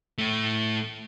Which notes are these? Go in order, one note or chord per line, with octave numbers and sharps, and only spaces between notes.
A2 A3